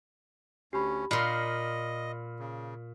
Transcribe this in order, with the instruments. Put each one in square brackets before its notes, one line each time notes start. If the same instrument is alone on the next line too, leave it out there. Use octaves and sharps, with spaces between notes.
[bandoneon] D2 C#4 [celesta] G4 B5
[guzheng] A#2 C6 [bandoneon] D#5 [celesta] B5 F6
[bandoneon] C#3